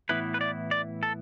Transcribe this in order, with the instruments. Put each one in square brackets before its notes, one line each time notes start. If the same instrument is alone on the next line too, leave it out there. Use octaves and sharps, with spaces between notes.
[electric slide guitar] A2 E3 B3 E4 B4
B4
D5
D5
A4